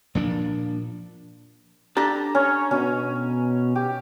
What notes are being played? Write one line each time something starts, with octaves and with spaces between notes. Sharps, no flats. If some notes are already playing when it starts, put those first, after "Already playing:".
A#2 F3 D4
D4 G4 A4 A#5
C#4 C#5
B2 C#4
G4